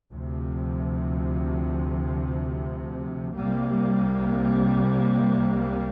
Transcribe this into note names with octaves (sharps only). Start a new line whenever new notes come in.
D2 C3 F3
C2 C3 G3 A#3